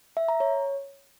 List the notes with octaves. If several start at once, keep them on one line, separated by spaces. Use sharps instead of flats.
E5
A#5
C#5